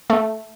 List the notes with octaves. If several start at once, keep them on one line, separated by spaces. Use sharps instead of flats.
A3